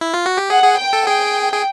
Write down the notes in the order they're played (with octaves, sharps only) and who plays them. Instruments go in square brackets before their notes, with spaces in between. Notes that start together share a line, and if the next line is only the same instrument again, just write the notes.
[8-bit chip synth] E4
F4
F#4
G4
[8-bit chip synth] G#4 [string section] F#5
[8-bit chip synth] G#4
[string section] G5
[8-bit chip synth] A4
[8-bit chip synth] G#4 [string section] G5
[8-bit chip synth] G#4